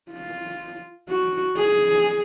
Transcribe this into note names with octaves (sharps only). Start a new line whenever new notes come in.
F4
F#4
G#4